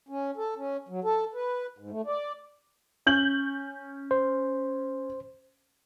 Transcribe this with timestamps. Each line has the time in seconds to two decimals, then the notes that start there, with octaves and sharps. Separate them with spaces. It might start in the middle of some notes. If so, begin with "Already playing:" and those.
0.09 C#4
0.37 A4
0.56 C#4
0.89 F#3
1.04 A4
1.34 B4
1.78 G#2
1.91 A3
2.06 D5
3.06 C#4 G6 F#7
4.11 C5